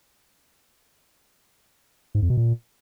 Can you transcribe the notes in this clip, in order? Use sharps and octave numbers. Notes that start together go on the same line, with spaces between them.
G#2
F2
B2
A#2